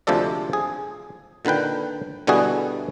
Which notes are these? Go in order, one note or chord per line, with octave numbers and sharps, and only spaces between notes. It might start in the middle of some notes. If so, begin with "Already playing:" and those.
D2 C3 F3 G#3 A4 D5
G#4
A#2 D3 D#3 B4 G5
B2 D3 G3 E4 F#4 G#4